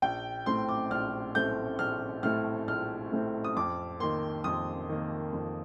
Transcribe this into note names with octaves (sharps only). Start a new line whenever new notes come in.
A#1 G5
A2 A3 C4 C6
D6
A#1 F6
A2 A3 C4 G6
A#1 F6
A2 A3 C4 F6
A#1 F6
A2 A3 C4
D#6
F2 D6
D#3 A#3 C6
F2 D#6
D#3 A#3
F2